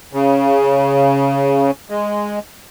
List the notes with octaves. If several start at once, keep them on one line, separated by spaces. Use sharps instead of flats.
C#3
G#3